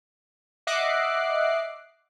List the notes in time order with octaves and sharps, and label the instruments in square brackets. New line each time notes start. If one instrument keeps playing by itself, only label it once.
[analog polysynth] D#5 E5 F#5 D6 F#6 C7